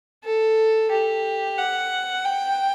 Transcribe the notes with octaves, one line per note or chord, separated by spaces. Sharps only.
A4
G4
F#5
G5